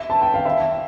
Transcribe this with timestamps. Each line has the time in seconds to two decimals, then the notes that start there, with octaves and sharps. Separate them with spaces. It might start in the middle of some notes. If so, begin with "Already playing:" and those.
Already playing: E5
0.10 A5
0.22 G5
0.34 F5
0.45 E5